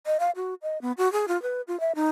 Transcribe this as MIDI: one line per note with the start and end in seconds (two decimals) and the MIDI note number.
0.06 0.17 75
0.20 0.31 77
0.36 0.54 66
0.62 0.80 75
0.82 0.92 59
0.97 1.11 66
1.12 1.25 68
1.28 1.40 65
1.42 1.61 71
1.68 1.79 65
1.80 1.92 76
1.95 2.10 63